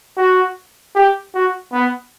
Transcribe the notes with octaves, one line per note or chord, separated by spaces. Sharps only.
F#4
G4
F#4
B3